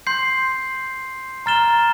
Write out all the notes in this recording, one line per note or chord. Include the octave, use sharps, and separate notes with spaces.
C6 G6 C7
A#5 F6 A6 E7 G7